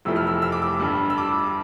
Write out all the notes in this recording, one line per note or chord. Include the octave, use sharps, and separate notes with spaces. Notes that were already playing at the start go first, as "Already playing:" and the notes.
F1 F2 E3 A3 E6
F6
E6
E6
D6
E6
G2 D3 G3
E6
D6